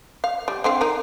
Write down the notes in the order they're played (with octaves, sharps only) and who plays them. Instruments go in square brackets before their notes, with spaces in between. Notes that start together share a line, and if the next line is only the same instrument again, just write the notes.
[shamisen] F5
G3
D3 C4 F5
D#4 A#4